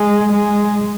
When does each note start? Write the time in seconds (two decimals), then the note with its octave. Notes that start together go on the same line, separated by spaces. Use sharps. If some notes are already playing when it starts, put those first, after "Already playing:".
Already playing: G#3
0.33 G#3